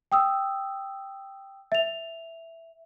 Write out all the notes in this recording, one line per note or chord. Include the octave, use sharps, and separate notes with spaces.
G5 D#6 E6
E5 F7